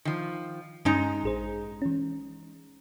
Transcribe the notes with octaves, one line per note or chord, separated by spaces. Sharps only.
D#3 F3
G2 G#3 C#4 D#4 A#5 G6
A1 G#4 C5
E3 C#4